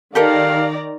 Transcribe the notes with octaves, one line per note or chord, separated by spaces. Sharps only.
D#3 G4 A4 A#4 D5 F5 A#5